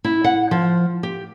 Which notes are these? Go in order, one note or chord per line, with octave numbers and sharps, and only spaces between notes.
E4
F#5
F3
G4